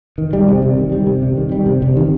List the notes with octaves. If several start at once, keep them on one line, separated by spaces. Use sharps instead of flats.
D#3
G3
C3
C3
D#3
G3
C3
C3
D#3
G3
C3
C3
D#3